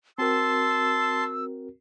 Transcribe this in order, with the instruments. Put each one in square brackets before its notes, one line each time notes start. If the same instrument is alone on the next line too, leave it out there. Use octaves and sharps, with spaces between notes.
[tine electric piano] C4 F#4 A#4 [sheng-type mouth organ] A5 C6 [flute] E6